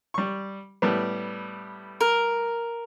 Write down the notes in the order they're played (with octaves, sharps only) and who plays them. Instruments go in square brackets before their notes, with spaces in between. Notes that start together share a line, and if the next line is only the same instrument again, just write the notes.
[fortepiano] G3 C#6
A2 G3 B3
[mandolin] A#4